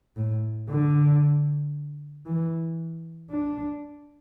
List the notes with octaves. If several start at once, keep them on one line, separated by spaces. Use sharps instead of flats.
A2
D3
E3
D4